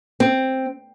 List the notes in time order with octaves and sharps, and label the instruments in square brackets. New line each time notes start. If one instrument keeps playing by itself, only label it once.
[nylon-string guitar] C4